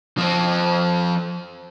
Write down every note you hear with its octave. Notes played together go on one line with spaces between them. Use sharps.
F3 C4